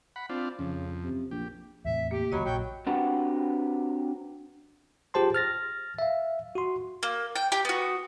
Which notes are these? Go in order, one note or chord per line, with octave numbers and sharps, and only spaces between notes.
F#5 B5
C4 D4 F4
F2 C#3
C3
A#1 G4
E2 A2 C3 E5
A#3 G4
C#2 F#2 D#3 F#3 D#5 A#5 B5
A#1 F#3 G5
C4 D4 F#4 G4 B4 F#5
F4 G4 G#4 C5 A5 C6
F6 A6 A#6
E5 F5
F#4 C6
A#3
G5
G4 G5
B3 F#4